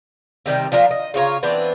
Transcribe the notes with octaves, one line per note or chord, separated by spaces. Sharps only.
C3 D#3 G3
F3 D4 F4 A#4
D#5
C#3 F4 C#5 A#5
E3 B3 C4 D4